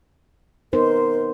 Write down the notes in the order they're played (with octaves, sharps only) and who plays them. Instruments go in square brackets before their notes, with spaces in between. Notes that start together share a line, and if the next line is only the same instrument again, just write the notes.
[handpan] B3 D#4 C5 [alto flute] A#4